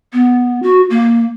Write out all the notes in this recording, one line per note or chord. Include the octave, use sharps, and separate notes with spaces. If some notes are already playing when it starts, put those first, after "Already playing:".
B3
F#4
A#3